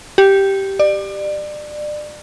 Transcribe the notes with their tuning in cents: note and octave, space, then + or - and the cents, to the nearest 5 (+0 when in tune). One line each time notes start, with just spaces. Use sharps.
G4 -5
D5 +30